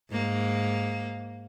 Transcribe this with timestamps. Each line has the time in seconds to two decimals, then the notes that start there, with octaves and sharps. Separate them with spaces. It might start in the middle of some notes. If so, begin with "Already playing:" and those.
0.11 G#2 A#3